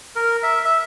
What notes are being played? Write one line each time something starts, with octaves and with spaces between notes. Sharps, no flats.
A#4
E5
E5